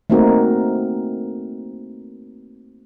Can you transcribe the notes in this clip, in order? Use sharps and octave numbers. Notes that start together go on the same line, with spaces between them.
A3 A#3 C4 D#4 F#4 A#4